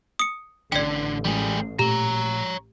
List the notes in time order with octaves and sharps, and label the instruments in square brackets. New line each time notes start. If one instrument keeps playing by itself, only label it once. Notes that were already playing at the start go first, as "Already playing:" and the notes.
[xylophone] D#6 C#7
[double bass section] A1 [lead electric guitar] D3 [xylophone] D5 G5
[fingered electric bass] E3 G#3 [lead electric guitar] G3 G#4
[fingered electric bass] A#2 A3 [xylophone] G4 [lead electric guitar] C#5 A#5